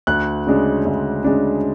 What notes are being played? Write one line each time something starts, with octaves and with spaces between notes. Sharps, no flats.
D2 F#6
C#3 G#3 D4
D2
C#3 G#3 D4